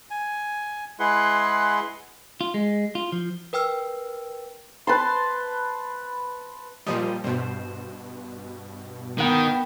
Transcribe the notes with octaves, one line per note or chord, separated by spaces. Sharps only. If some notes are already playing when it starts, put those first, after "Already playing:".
G#5
G#3 E4 G#4 B4 F#5 C6
F4
G#3
F4
F3
A#4 B4 G5 E6 F6
B4 A5 C6
A#2 F3 G3 D#5
G2 B2 C5
D#3 B3 D#5 F#5 G5